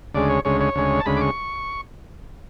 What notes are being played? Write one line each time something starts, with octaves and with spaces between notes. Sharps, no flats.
D2 C#3 G#3 D5
C#5
D2 C#3 G#3 C#5
C#5
D2 C#3 G#3
A5
D2 C#3 G#3 B5
D6
C#6